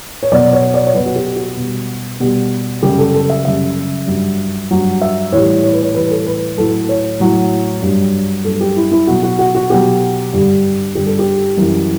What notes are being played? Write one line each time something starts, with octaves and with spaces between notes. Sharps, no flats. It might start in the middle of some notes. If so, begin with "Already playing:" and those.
C#5
B2 F#3 D5
C#5
D5
C#5
B2 F#3 B4
F#4
G4
F#4
B2 G3
B2 G3
F#2 C#3 G3 G4
A4
A4
E5
F#2 C#3 G3 E5
G2 F#3
G2 F#3
E5
A2 E3 G3 C#5
C#5
B4
C#5
A2 E3 G3 B4
A4
B4
A2 F#3 A4
C#5
A2 F#3
G2 F#3
G2 F#3 A4
G4
E4
E4
B2 F#3 F#4
F#4
F#4
F#4
B2 F#3 G4
G2 D3 G3
G2 D3 G3 G4
A4
G4
F#2 E3 G3